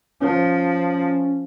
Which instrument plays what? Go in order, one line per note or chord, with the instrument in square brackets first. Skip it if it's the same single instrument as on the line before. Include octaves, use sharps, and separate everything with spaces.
[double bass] F3 [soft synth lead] C#4